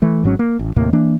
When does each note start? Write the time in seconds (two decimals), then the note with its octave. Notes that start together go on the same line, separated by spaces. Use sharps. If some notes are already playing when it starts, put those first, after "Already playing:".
0.02 E3 A3
0.23 G#1 G#2 F#3 C#4
0.39 A#3
0.59 A1
0.76 D#2 A2 C3 A#3
0.93 E3 A#3 D4